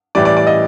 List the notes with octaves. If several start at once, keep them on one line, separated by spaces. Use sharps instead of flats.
A2 E3 G3 D5
D5
D5
D#5